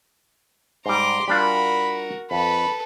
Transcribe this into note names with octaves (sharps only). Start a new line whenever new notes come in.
G#2 G3 A#5 C6 D6
G3 D4 F4 F#4 A#4 B5
F2 A4 B4 B5